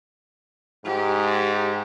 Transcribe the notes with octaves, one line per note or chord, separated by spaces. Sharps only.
G#2 G4